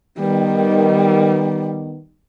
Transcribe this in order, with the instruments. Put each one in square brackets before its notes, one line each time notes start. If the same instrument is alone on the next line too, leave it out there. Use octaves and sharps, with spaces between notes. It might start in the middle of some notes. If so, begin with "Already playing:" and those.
[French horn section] D#3 B3 [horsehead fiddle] G3